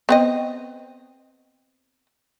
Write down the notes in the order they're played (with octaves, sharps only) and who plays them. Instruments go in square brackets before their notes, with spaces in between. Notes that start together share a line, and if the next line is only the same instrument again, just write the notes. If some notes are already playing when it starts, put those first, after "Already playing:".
[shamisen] B3 C4 D#5